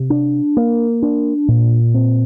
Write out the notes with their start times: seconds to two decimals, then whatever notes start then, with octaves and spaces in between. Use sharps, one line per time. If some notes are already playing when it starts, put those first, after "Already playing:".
Already playing: C3
0.10 D4
0.57 A#3
1.02 D4
1.48 A#2
1.94 C4